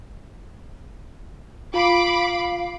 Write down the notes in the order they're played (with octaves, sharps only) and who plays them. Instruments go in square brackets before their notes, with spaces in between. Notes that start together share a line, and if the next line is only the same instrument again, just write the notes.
[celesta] F4 [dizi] F5 [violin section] B5 D6